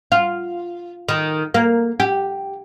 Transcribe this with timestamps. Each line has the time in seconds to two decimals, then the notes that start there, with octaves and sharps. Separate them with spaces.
0.12 F4
1.08 D#3
1.54 A#3
2.00 G4